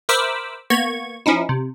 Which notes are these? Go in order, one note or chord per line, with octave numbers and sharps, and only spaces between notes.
A#4 C5 E5 B5 D6 E6
A#3 B3 C#6 G#6
F3 C#4 D#4 E4
C3